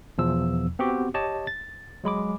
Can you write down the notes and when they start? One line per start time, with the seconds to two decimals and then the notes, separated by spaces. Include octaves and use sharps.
0.18 E2 B2 F3 E6
0.79 B3 C4 F#4 G4
1.14 G4 C#5 D#5 A5
1.47 A6
2.04 F#3 G#3 B5 D6